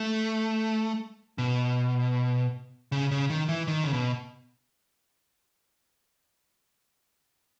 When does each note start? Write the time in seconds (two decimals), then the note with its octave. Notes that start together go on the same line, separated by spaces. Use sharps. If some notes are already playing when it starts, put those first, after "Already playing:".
Already playing: A3
1.38 B2
2.92 C#3
3.11 C#3
3.30 D#3
3.49 E3
3.68 D#3
3.84 C#3
3.93 B2